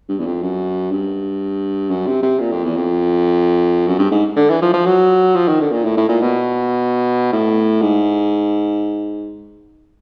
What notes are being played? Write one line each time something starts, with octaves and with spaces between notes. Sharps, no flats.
G2
E2
F2
F#2
G2
F#2
C3
C3
A#2
F2
E2
F2
F#2
G2
G#2
D3
E3
F3
F3
F#3
F3
D#3
D3
A#2
A2
A2
A#2
B2
A2
G#2